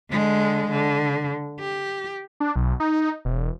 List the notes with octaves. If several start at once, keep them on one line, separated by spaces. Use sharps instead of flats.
D3 G#3
D3
G4
D4
B1
D#4
E1